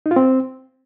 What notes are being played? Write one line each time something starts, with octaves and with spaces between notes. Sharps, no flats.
D#4
F4
C4